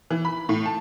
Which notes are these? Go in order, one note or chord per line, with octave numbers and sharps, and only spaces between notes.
E3
B5
A2
A5